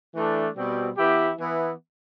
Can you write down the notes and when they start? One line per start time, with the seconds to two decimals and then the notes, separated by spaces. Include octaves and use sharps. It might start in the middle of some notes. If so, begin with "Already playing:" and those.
0.14 E3 A3 D4
0.55 B2 G3 C4
0.96 E3 B3 E4 G4
1.37 E3 B3 E4